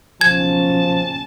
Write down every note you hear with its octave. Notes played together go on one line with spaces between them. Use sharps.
F#1 B1 F3 C#4 A5 G#6